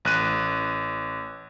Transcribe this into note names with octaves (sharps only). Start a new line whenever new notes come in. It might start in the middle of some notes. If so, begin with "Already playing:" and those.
A1 F#6 D#7